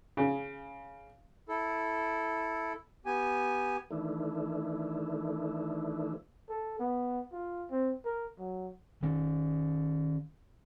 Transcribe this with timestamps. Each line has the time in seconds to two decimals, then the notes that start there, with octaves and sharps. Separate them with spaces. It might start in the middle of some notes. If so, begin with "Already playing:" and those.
0.17 C#3
1.48 E4 A4
3.06 B3 G4 G#5
3.91 D#3 E3 A3 D4 E4
6.49 A4
6.79 B3
7.32 F4
7.71 C4
8.05 A#4
8.39 F#3
9.03 D#3 C#4